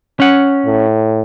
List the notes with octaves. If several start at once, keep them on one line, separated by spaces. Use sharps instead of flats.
C#4 F#5
A2